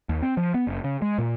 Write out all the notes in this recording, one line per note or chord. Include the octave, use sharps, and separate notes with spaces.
D#2
C4
F3
B3
F#1
C#3
G#3
A#2